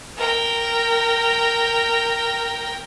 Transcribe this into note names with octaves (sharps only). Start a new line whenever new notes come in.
A#4 G5